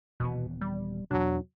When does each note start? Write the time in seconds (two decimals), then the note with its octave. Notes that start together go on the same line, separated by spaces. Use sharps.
0.20 D#1 B2 E3 B3
0.61 G3
1.11 E2 B2 F#3 D4